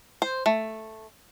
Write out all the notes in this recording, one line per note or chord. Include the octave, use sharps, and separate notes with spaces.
C5
A3